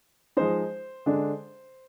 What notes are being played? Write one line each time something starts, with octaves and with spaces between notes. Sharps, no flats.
F3 G#3 D#4 C5
D3 G#3 D4